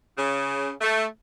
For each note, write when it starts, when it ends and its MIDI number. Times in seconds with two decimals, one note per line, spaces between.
0.18 0.70 49
0.81 1.05 57